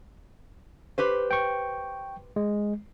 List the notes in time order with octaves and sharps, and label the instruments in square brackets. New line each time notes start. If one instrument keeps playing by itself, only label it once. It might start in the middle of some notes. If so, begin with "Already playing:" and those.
[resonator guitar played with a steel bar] G4 B4 C5
[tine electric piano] G5 C#6
G#3